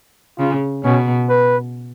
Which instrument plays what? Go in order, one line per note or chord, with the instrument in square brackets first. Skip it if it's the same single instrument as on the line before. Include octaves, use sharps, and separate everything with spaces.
[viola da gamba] C#3 [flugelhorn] F4
[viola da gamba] B2 [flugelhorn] C#4
[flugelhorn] B4